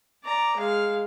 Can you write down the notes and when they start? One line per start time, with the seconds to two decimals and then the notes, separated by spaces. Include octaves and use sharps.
0.24 D5 A#5
0.57 G#3 F5